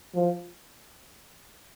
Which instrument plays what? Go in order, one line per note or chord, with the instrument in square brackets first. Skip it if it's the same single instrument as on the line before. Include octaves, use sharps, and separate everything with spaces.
[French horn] F3